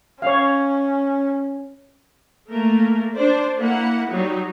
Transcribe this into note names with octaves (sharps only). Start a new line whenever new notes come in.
C#4 C#5 F5
A3 A#3 A#4
D4 C5 D5
A#3 E4 F#5
F#3 G3 D#4